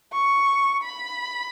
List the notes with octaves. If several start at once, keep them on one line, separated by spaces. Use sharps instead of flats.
C#6
B5